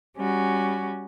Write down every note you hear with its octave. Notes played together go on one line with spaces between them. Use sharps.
G3 C#4 F#4